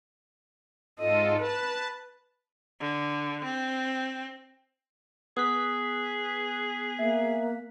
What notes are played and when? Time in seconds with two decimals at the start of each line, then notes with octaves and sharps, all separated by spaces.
1.00 G#2 F4 A4 D#5
1.39 B4 A5
2.81 D3
3.44 C4
5.37 B3 G#4 D#6 F#6 B6
6.99 A#3 E5